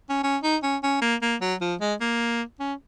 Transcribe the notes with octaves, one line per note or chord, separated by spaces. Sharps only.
C#4
C#4
D#4
C#4
C#4
A#3
A#3
F#3
F3
G#3
A#3
C#4